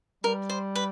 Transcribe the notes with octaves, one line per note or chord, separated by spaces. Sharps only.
G3 A#4
C5
B4